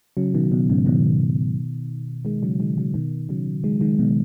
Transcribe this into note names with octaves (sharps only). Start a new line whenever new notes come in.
C#3 F#3
B2 D#3
B2
G#2 C#3
B2 D#3
D#3 G#3
C#3 F#3
D#3 G#3
C#3 F#3
B2 D#3
C#3 F#3
D#3 G#3
D#3 G#3
B2 D#3